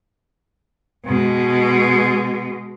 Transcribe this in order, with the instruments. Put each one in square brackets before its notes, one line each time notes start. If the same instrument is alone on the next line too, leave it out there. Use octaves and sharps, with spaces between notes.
[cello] B2 G#3